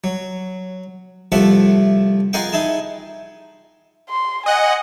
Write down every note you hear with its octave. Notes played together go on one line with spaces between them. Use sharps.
F#3
C2 F3 A3 F4 E5 F#5
F4 G#4 A#4 D#5 F#5 G5
D#4 E4 G#4 A5
C6
D#5 F#5 G#5